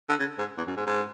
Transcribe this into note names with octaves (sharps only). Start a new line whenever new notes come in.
D3
C#3
G#2
E2
F#2
G#2
G#2